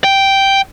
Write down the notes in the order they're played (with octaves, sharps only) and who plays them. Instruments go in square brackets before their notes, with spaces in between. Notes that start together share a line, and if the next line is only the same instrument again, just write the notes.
[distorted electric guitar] G5